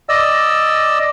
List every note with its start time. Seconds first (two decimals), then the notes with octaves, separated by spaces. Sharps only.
0.09 D5 D#5 E6